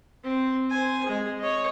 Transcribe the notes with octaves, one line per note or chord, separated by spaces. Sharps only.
C4
C5 G#5
G#3 G#4
C#5 D#5